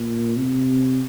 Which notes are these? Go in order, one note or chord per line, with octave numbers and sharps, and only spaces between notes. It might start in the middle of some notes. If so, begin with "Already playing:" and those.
Already playing: A#2
C3